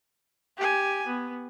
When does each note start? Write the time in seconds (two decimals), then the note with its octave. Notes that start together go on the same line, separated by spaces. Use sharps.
0.57 G4 G#5
1.07 B3